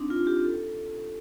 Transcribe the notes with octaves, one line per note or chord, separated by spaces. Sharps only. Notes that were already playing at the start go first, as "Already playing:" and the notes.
Already playing: C4 D4 D#4
F4
G4
A4